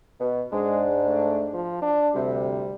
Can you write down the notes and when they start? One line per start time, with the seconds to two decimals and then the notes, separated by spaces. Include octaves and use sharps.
0.20 B2
0.52 G#2 G#3 D4
1.06 A3
1.53 F3
1.82 D4
2.15 D2 C3 G3